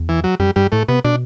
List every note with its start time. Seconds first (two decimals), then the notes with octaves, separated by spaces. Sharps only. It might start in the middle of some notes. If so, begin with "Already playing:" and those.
Already playing: E2
0.09 E3
0.24 F#3
0.40 F#2 G3
0.56 G2 G3
0.72 A2 A3
0.88 C3 B3
1.05 B2 D4